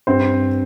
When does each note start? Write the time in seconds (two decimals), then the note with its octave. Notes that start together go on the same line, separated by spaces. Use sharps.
0.07 G2 C4 C5